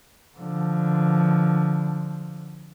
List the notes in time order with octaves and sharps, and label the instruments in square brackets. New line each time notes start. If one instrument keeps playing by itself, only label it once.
[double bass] D3 F3